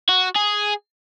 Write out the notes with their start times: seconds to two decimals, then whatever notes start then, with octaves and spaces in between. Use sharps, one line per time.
0.09 F#4
0.36 G#4